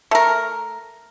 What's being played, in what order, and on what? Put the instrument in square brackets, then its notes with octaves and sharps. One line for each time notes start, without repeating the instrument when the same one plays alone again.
[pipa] A3 A#4